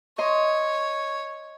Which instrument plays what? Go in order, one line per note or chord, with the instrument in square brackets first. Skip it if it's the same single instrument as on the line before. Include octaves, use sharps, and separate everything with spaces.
[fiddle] C#5 [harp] D#5 C6